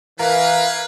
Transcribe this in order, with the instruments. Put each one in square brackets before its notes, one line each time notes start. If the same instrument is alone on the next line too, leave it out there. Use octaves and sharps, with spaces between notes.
[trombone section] E3 [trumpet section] C#4 G#4 B4 [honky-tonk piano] A#4 [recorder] F5